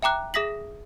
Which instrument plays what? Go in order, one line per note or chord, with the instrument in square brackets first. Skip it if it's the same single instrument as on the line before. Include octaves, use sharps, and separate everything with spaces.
[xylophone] E5 G5 A#5 D6 F#6
G#4 E5 D#6 A#6 B6 F#7